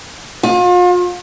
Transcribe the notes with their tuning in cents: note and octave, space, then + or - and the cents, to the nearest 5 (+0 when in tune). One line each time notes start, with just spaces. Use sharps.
F4 +40